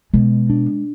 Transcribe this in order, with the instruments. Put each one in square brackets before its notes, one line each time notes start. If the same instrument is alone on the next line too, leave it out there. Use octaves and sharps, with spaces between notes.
[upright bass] B2 [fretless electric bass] G#3
[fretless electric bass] D4